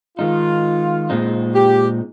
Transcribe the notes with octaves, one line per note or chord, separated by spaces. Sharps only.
D#3 G#3 D#4 F4
A#2 G#3 C4 D#4
G4